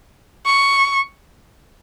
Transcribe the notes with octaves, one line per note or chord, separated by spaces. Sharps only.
C#6